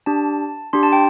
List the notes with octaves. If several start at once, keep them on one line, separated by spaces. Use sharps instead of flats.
D4 G4 A5
D4 G4 C6
A5
G5